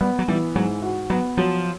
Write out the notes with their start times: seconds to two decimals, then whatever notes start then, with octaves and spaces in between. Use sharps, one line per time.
0.01 G3 B3
0.19 F#3
0.28 E3 G3
0.55 G#2 F#3
0.82 F#4
1.10 F#3 B3
1.37 F3 F#3